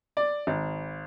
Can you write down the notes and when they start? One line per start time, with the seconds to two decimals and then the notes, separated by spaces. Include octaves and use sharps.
0.17 D5
0.47 G#1